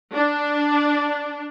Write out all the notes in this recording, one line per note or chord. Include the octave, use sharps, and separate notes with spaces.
D4